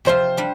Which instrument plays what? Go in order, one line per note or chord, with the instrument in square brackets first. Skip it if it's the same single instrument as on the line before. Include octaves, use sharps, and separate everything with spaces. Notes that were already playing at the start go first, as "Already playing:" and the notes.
[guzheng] C3 F3 C4 F4 [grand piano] C5
[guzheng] G3 D4